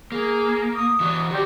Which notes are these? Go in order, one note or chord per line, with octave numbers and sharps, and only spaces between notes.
A#3 G#4
D#6
E3 F#4
F#4 G4 D5